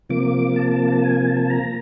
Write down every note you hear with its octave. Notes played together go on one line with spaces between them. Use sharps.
C3 F3 A#3 D6
A5
A5
G#5
A5
A#5